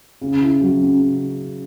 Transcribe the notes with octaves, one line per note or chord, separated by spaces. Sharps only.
C#3
E4
F#3
C#4
C#3